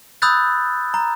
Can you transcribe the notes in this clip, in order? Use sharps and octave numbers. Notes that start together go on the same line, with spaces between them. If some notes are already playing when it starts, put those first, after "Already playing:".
B5 D#6 E6 F#6 G6 A6
A#5